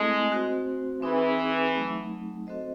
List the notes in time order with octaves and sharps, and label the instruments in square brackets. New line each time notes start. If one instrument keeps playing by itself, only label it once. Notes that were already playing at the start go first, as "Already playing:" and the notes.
Already playing: [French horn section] G#3 [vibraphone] A3 C4 E4 A4
[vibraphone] C4 F#4 C5
[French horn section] E3 [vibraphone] C4 D#4 G#4
[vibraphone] F#3 A3 D#4
C4 F#4 A4 C5 D#5